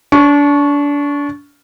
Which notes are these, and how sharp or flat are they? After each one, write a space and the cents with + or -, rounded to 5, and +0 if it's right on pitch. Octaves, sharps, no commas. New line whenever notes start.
D4 -30 C#6 +0